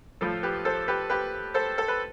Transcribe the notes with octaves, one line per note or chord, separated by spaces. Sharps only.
A2 F3 F4 A4
G4 B4
A4 C5
G4 B4
G4 B4
A4 C5
A4
B4